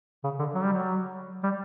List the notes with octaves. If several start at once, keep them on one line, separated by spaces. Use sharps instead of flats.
C#3
D3
F#3
G3
F#3
G3